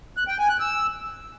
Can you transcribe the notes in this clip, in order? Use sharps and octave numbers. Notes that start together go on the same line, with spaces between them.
F#6
G5
G#5
F#6
E6